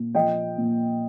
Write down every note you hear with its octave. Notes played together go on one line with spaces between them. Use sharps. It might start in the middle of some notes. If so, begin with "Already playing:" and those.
Already playing: A#2
F3 D#5 G5
A#2